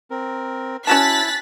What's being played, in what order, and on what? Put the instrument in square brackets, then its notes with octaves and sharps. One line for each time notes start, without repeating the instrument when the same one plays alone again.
[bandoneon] C4 A#4
[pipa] C#4 F#4 A5 [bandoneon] E4 [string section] F#6 A6 B6